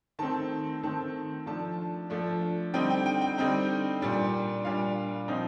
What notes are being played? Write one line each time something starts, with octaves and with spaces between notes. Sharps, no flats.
D#3 A3 C4 A5
D#3 A3 C4 A5
F3 A3 D4 A5
F3 A3 D4
D3 G3 C4 D#4 G5
G5
G5
G5
D3 G3 C4 D#4
A#2 G3 D4
A#2 G3 D4 F5
F3 C4 D#4